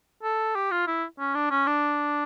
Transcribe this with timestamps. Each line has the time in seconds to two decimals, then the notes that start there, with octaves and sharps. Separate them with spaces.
0.23 A4
0.55 G4
0.71 F4
0.87 E4
1.19 C#4
1.35 D4
1.51 C#4
1.67 D4